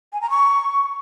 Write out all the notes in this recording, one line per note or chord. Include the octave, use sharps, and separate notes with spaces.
G#5
A#5
C#6